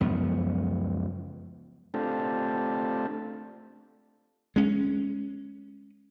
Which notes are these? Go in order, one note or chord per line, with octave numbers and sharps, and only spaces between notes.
C#2 F#2 F3 B3
A3 C4 D4 F4 G4 A4
G#3 C#4